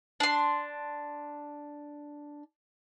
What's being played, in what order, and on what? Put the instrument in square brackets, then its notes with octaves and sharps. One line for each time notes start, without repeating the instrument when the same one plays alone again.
[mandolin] D4 C6